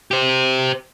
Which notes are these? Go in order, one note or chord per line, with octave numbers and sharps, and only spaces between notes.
G4 C5